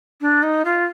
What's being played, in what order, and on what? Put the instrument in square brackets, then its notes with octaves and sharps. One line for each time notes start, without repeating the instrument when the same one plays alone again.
[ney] D4
D#4
F4